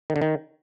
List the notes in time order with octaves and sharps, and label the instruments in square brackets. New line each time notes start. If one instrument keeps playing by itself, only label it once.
[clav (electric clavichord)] D#3
D3
D#3